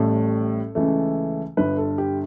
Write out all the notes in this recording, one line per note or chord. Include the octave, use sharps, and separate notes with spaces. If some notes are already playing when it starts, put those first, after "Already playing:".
Already playing: A1 A2 G3 A4
C#2 C#3 E3 A3
G1 G2 D3 B4
A4
G4